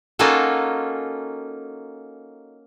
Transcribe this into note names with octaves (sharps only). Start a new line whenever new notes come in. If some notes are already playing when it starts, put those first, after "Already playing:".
A#3 C#4 D#4 F4 F#4 A4